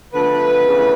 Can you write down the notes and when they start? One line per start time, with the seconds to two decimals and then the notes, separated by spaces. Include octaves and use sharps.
0.13 D3 F3 A3 B3 B4
0.65 C#3 E3 A3